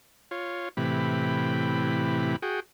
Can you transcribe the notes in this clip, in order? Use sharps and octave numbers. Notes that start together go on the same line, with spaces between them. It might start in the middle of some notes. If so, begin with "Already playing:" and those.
F4 C#5
A2 C3 E3 G4 B5
F#4 G#4 G5